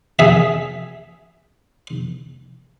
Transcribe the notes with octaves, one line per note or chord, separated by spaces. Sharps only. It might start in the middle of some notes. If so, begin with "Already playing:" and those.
G#4 E5